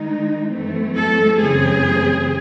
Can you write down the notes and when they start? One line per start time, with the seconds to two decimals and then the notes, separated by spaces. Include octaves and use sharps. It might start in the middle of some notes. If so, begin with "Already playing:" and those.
Already playing: D#3 G#3 D#4
0.50 F#2 E3 A3 C4
0.95 A4
1.39 F#2 C#3 E3 A3 C4 G#4